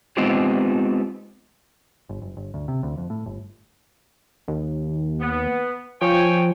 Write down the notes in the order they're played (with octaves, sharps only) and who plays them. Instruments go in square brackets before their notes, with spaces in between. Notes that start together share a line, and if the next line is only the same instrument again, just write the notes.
[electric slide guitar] G#3 B3 C4 D#4 F4 G4
[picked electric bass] G1
F#1
G1
D2
C3
D2
F2
A2
G1
[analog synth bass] D#2
[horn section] B3
[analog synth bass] F3 [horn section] C#5 G5 G#5